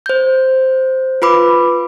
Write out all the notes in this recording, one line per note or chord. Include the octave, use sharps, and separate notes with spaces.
C5 G6
F4 B4 B5 D6